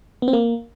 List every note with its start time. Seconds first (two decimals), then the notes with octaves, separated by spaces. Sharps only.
0.22 B3
0.28 C4
0.33 A#3